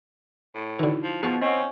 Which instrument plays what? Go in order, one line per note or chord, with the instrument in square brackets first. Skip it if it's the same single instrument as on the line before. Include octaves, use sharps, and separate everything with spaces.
[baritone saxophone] A2
[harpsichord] D3 E3 [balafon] D#4 E4 F#4
[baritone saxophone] F3
[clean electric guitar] B2 [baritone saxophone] F3 [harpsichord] G#4 A5 C#6
[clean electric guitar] C4 [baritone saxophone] C#4 [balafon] D#5 F#5